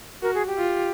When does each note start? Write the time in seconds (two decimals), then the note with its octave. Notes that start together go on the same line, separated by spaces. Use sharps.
0.22 F#4 A#4
0.34 G#4
0.47 G4
0.58 F4